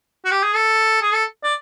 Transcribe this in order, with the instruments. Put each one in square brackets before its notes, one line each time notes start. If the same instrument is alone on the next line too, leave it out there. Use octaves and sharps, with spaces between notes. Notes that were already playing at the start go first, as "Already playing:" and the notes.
[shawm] F#4
G4
G#4
A4
G#4
A4
D5